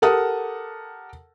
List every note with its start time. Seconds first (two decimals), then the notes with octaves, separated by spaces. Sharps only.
0.02 G4 A4 A#4 F#5 A5 D#6